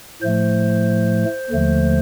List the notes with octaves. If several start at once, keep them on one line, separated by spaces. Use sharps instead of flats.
A2 F3 A3 C5
D#2 D3 F3 A3